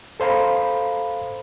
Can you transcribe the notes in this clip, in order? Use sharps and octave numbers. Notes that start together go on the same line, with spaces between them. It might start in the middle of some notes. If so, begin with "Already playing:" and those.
A4 C5 F5 A#5 B5